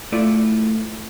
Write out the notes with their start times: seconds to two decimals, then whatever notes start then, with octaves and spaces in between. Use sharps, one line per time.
0.12 A3 E4 F4 D5